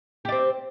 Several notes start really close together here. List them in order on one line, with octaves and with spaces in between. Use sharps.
G4 D5 C4